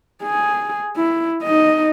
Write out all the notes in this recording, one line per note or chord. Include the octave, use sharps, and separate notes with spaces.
G#4
E4
D#4 D#5